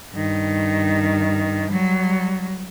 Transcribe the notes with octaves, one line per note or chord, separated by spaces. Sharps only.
G2 D#3
F#3 G3